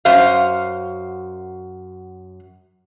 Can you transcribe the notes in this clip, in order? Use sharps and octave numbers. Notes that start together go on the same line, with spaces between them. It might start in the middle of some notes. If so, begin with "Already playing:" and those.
F#2 F#4 C5 F5